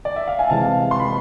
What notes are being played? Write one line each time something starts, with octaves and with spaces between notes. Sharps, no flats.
D5
E5
F5
G#5
C3 E3 G#3 F5 A5
C6
B5